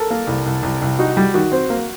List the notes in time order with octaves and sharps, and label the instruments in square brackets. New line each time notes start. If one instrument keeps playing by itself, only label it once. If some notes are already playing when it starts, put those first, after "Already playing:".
Already playing: [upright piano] A4 A#4
[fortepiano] A#3
C2
C2
C2
C2
[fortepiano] D#4 [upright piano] F#4
[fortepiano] G3
[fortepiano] D#3 [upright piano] F#4
[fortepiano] C4
A#3